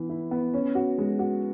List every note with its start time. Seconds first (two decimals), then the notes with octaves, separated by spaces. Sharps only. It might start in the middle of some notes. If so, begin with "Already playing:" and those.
Already playing: E3 B3 B4
0.09 E4
0.31 B3
0.54 C#4
0.75 F#4
0.98 G#3
1.19 F#4